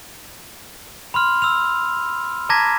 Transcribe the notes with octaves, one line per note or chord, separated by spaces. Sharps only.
B5 C6 F6
E6 F6 F7
A5 A#5 D6 G#6 A#6 B6